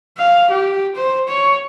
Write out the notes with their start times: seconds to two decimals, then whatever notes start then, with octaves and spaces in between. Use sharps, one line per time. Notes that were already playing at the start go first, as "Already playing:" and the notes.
0.18 F5
0.50 G4
0.96 C5
1.28 C#5